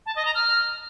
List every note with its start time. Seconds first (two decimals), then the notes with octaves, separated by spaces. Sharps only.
0.06 A5
0.16 D#5
0.25 A#5
0.35 F6